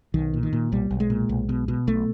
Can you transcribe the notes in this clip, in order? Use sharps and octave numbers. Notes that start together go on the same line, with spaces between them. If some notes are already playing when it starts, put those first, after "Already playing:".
B1 D#3
A#2
D#3
A#2
B1 G3
B1
G#3
A#2
B1
B2
B2
B1 A3